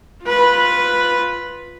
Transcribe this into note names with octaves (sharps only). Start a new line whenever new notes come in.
F4 B4